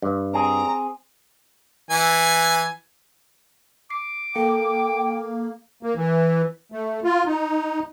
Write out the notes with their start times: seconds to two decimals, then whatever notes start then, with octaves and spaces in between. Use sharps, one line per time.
0.02 G2
0.33 C4 G#4 A#5
1.90 E3 G#5
3.90 D6 C7
4.35 A#3 A4 G5 C#7
5.83 A#3
5.95 E3
6.72 A3
7.04 F4
7.27 D#4